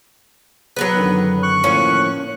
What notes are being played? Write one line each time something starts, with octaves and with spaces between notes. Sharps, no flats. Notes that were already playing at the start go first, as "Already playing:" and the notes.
F#3 B3 B4
F#2 D3 D#3
C#6 F#6
A2 F3 A#3 C#4